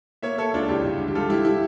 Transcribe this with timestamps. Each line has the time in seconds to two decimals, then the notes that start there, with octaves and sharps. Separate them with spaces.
0.23 A#3 C#5 E5
0.38 A#3 A4 C#5
0.54 C#2 D4 F4
0.68 C#2 E4 G4
0.84 G2
1.00 D3
1.08 G4
1.15 G3 F4 A4
1.29 G3 E4 G4
1.45 E4 G4